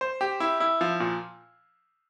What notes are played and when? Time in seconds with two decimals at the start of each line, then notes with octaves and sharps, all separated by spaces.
0.01 C5
0.21 G4
0.40 E4
0.60 E4
0.81 F3
1.00 A#2